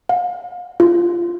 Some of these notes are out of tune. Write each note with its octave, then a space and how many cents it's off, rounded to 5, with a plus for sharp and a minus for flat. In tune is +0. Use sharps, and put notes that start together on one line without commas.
F5 +40
F4 -10